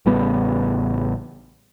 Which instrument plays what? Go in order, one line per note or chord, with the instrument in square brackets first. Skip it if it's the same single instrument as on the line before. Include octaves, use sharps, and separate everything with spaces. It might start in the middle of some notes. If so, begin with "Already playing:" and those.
[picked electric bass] A1 C#3 G3 B3